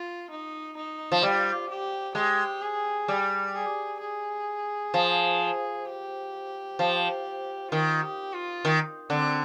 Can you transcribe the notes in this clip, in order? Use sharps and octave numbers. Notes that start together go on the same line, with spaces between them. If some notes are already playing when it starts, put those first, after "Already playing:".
Already playing: F4
D#4
D#4
F3
G3 F4
G4
G#3 G4
G#4
G3
G#4
G#4
F3
G4
F3
D#3 F4
G4
F4
D#3
D3 C4